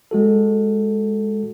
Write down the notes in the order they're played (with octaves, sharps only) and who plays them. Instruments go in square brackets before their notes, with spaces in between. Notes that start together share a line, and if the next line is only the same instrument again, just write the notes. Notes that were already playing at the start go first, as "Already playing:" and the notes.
[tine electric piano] G#3 F#4 A4